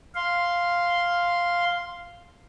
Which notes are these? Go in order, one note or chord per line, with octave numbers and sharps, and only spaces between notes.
F5 C6